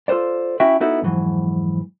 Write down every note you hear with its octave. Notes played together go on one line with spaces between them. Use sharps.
F4 A4 B4 C5 D5
C#4 E4 F#4 E5 G5
B3 D#4 E4 F#4 A4
F2 G#2 E3 F#3